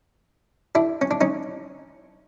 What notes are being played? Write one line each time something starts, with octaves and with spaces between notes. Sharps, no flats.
D4 E4
C#4
D4
C#4 D#4